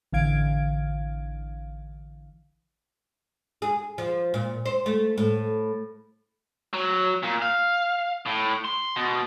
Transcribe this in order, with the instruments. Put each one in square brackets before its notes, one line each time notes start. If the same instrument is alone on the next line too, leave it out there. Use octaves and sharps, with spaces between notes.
[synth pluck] A1 D3 E3 F5 G#6 D7
[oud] G#4
F3
A#2
C5
A3
A2
[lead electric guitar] F#3
A#2
F5
A2
C6
B2